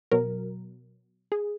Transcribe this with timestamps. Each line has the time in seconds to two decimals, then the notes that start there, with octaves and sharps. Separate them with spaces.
0.12 B2 F#3 A#4
1.32 G#4